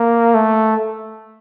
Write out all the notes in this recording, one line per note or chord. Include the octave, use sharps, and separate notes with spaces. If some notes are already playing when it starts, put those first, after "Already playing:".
Already playing: A#3
A3